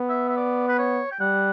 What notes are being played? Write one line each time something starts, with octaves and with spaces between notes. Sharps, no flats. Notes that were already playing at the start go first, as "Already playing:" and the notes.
Already playing: B3
E5
E5
D5
B4
C#5
G5
G3 F#5